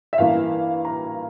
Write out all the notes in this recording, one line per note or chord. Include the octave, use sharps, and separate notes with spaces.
E5
G2 E3 A#3 F5
A#5